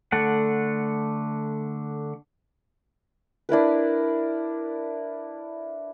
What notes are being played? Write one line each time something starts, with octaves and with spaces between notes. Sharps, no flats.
D3 A3 F#5
D4 E4 A#4 B4